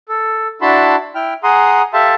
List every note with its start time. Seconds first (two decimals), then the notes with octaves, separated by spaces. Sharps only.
0.09 A4
0.62 D4 E4 F#4 A5 B5 C6
1.15 E4 G5 F6
1.43 G#4 F#5 A#5 C6 D#6
1.94 G4 A4 E5 F5 A5 C6